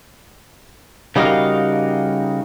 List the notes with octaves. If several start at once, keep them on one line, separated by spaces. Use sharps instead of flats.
C#3 G3 D#4 F#4 A#4 F5